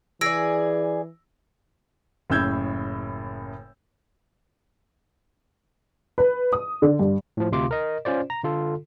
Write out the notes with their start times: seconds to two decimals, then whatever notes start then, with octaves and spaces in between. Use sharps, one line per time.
0.21 E3 G#4 D5 E6 A#6 D7
2.30 F#1 A2 C#3 E6 G6 G#6
6.18 B4
6.53 D#6
6.82 D3
6.99 G2
7.37 A2 F3
7.52 D2 C3 F4 F5 C6 D6
7.71 A#4 D#5
8.05 C#4 F4 C5 D5
8.30 A#5
8.43 D3 F4 A4